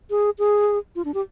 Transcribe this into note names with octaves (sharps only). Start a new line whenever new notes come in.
G#4
G#4
F4
D4
G4